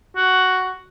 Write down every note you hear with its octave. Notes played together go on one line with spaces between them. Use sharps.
F#4